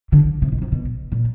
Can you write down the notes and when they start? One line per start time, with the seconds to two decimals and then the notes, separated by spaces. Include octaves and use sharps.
0.12 D3
0.42 C3
0.52 B2
0.62 C3
0.72 B2
1.12 A#2